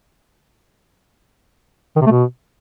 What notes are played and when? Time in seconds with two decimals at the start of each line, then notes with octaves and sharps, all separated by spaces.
1.96 D#3
2.01 C3
2.06 A3
2.11 B2